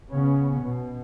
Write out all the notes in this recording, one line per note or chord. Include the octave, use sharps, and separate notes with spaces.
C#3 B3 C#4
B2